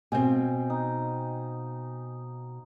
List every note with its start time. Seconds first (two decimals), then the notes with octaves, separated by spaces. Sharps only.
0.12 B2 C4 F5 G5 G#5
0.70 D#4